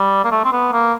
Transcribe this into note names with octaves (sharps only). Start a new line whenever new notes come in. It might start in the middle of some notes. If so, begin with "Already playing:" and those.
Already playing: G3
A#3
A3
C4
B3
A#3